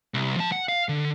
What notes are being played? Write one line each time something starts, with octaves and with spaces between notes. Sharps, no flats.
C2
F3 A5
F#5
F5
D3